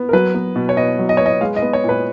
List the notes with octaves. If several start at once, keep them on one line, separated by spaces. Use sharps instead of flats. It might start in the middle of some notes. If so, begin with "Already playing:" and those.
Already playing: B3
A#4
F#3 B4
B3
B2
C#5
B2 D#5
F#3
D#5
B3 C#5
D#5
G#3 F5
D#5
B3
C#5
A#2 B4